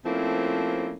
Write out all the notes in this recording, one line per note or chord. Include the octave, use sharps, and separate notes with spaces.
F3 A3 A#3 C4 C#4 E4